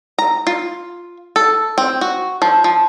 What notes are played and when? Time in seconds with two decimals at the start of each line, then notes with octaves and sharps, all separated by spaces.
0.18 A#5
0.47 F4
1.36 A4
1.78 C4
2.01 F#4
2.42 F3
2.64 F3